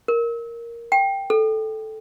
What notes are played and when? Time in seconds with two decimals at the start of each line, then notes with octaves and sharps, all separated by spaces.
0.08 A#4
0.92 G5
1.30 A4